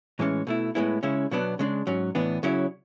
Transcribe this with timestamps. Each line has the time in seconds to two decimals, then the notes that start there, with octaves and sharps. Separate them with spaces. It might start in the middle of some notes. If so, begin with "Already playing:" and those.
0.19 A2 E3 G#3 C#4
0.47 B2 A3 E4
0.75 A2 G#3 B3 E4
1.03 C#3 G#3 C#4 E4
1.31 B2 F#3 B3 D4
1.59 C#3 G#3 D4
1.87 G#2 F#3 C#4
2.15 A2 E3 B3 D4
2.43 C#3 F#3 C#4 E4